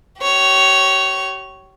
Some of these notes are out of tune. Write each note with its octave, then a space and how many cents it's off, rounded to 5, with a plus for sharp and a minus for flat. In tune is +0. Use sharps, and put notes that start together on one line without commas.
G4 -40 C#5 +0